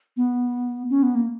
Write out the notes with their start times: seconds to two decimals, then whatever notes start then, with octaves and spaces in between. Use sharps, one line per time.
0.17 B3
0.90 C#4
1.03 B3
1.15 A#3